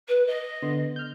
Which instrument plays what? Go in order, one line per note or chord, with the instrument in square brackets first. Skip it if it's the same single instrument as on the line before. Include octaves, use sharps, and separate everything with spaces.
[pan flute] B4
D#5
[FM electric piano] D3 B3 C6
F6 G6